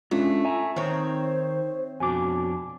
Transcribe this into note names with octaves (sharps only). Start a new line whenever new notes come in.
G#3 A3 C#4 D4 F4
E5 G#5 A#5
D#3 C4 D#4 C5 C#5
F2 B2 D4 F#4 G#5 D6